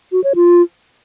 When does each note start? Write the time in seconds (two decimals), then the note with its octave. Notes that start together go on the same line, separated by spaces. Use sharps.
0.12 F#4
0.24 C#5
0.35 F4